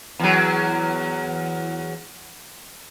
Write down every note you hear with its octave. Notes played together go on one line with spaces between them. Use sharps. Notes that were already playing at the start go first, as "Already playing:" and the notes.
E2 F#3